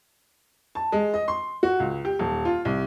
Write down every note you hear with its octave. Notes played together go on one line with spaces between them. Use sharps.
A5
G#3
D#5
C6
F#4
C#2
G4
D#1
F4
C2